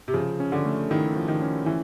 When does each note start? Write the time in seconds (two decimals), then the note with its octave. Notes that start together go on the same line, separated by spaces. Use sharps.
0.08 C3
0.14 C#3 F3
0.40 C#4
0.52 D3
0.65 A3
0.90 D#3 E4
1.16 F3
1.28 D#3
1.42 C#4
1.66 E3